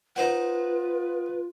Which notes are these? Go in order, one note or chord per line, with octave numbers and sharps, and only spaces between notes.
D#4 F4 B4 C5 F#5